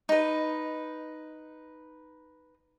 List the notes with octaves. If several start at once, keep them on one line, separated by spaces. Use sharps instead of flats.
D#4 B4